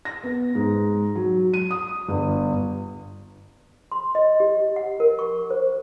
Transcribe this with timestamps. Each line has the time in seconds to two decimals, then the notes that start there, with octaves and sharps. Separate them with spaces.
0.05 A#6
0.24 B3
0.55 G#2
1.15 F#3
1.54 D#7
1.71 D#6
2.08 G1
3.92 C6
4.15 D#5
4.40 G4
4.76 F#5
5.00 A#4
5.19 C#6
5.50 C5